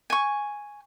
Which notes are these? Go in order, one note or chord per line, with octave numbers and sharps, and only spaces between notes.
G#5 C#6